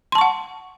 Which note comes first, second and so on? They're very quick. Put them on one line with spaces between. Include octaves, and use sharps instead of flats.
C6 A5 C#6 F#5